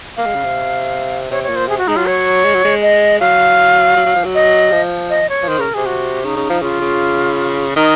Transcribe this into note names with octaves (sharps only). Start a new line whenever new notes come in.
A#3 F5
G#3
C#3
C3
C3 C#5
C#5
A#2
C5
C3 G#4
F#4
G#3 D#4
F#3 F4
C#5
G#3
F#3
G#3
D#5
F#3 F5
F#3
F#3
F3
F#3
D#5
F3
D#5
C#5
F3
D#3 C5
C#3 A#4
C3 G#4
F#4
C#3 D#4
C#3
F3
C#3 F4
C#3
D#3 D#4